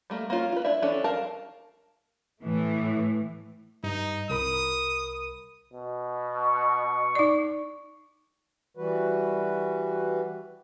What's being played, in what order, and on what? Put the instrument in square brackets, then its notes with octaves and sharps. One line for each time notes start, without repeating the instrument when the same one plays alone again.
[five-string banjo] G3 A3 A#3
A#3 C#4 F4
F4 B4
D4 E4 D5 E5
E3 C#4 D4 A4
A#4 F5 A5
[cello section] A2 E3 A3
[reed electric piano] G2 [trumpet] D#4
[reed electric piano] C2 A#4 B5 [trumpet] D#6
[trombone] B2
[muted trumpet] C#6
[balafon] D#4 D5
[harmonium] E3 G3 F#4 B4